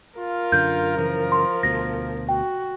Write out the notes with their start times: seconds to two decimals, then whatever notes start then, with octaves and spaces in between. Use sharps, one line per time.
0.19 F4 A#4
0.52 F#2 D3 G6
0.97 F#2 C#3 E3 F3
1.32 C6
1.63 D2 B2 A#6
2.29 F#4 G5